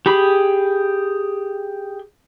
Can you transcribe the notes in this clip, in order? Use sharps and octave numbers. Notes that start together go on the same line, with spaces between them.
G4 G#4 B5